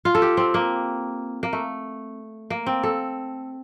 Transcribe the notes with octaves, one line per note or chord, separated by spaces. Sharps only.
F4
A4
G4
C4
A#3
A#3
A3
A#3
C4
A4